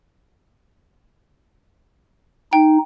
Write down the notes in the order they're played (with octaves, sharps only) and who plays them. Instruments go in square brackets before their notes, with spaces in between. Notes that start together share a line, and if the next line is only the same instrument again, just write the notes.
[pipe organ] D#4 [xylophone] G5